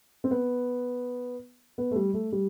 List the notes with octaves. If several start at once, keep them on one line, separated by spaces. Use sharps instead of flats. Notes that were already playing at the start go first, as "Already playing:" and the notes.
C4
B3
B3
A3
G3
A3
G3